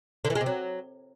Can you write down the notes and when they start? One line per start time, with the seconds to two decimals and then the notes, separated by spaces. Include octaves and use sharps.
0.25 D3
0.30 E3
0.35 G#3
0.41 C3
0.46 F#3